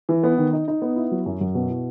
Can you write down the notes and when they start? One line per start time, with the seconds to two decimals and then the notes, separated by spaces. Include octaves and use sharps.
0.09 E3
0.23 B3
0.38 D#3
0.53 D#4
0.68 D#4
0.82 B3
0.96 E4
1.11 F#3
1.26 F#2
1.41 F#2
1.55 B2
1.69 E4